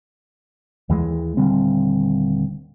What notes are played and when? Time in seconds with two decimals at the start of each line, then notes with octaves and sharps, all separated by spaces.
0.89 D#2 E3 G#3
1.37 D#1 D3 G3 C4